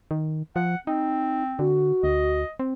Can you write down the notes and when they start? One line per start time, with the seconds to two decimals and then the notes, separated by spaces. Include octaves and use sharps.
0.11 D#3
0.56 F3 F#5
0.87 C4 D#4
1.59 D3 F#4
2.03 D2 D#5
2.59 C4